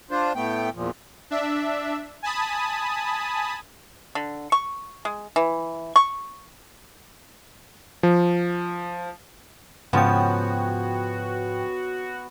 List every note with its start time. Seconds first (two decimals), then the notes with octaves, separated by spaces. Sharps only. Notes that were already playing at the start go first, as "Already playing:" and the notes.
0.11 D4 F4 C5
0.35 A2 A3 B3 G5
0.75 E2 A#2 F3
1.31 D4 E5
2.23 G#5 A5 B5 D#6
4.15 D3
4.52 C#6
5.05 G#3
5.36 E3
5.96 C#6
8.03 F3
9.93 G#2 C#3 F3 B3 F#4 C#5 G5